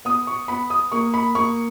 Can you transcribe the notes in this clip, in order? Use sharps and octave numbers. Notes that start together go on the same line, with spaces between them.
B3 D#6
C#6
B3 B5
D#6
A#3 C#6
B5
A#3 C#6